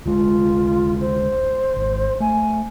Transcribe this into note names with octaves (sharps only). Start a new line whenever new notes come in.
D2 G#3 F4
C5
G#1
A3 G#5